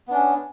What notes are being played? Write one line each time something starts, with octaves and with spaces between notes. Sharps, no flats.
B3 C#4 D4